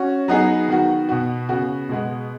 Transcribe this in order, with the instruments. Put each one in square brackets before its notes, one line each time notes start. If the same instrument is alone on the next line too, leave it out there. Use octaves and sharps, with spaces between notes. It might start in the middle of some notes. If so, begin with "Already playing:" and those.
Already playing: [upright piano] C#4 F#4
F#3 B3 D#4 G#4
D#3 B3 F#4
B2 B3 F#4
C#3 B3 F#4
B2 G#3 B3